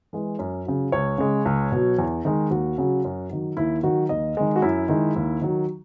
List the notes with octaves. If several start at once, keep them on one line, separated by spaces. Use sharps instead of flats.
E3 G#3
F#2
C#3 F#3
C#2 C#5
C#3 G#3
C#2
B2 F#3
E2
D#3 G#3
D#2 F#4
C#3 F#3
F#2
D#3 F#3
D#2 E4
D#3 F#3 F#4
D#2 D#5
D#3 G#3
F#4
F#2 E4
D#3 G#3
D#2
D#3 F#3